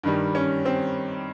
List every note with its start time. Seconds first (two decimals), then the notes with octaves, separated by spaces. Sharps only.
0.03 G2 D#3 G3
0.35 C#4
0.66 C4